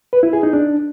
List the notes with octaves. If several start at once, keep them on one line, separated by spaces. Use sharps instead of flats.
B4
E4
G#4
D#4
D4